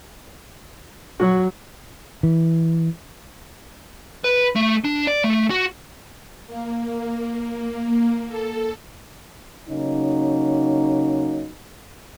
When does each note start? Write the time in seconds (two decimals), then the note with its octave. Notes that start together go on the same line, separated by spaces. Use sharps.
1.20 F#3 F#4
2.23 E3
4.24 B4
4.56 A3
4.85 D4
5.07 D5
5.24 A3
5.50 F#4
6.47 A#3
8.28 A4
9.69 C#3 F#3 A#3 C#4 D#4